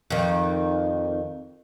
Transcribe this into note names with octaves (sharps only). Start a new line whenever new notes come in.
F2 D#3